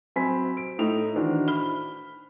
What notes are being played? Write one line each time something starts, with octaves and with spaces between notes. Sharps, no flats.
F#3 C4 G#5 B5 B6
D7
A2 D#4 F7
D#3 E3 D4 F#4 C5
B5 F6 G7